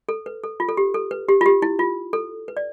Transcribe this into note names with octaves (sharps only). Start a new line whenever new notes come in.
A4
B4
A4
F4
A4
G4
A4
B4
G4
F4
G4
E4
F4
A4
B4
D5